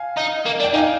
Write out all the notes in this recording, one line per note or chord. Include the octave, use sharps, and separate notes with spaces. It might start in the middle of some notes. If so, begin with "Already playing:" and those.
Already playing: F5 G#5
D#4
A#3
D4
G5
D#4 F5 G#5